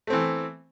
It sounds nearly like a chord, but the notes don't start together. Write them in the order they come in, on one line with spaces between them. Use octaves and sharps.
A3 C4 E3